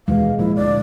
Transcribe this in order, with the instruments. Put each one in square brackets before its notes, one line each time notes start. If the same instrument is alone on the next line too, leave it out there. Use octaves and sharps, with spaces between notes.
[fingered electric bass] D#2 B2 E3 [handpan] G#3 [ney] F5
[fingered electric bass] A#2 F3 A#3 [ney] E4
[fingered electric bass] D2 A#2 [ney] D5